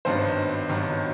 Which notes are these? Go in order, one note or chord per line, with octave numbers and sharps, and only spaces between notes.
G#1 G2 D#3 F#3 B3 C5
G#1 G2 D#3 F#3 B3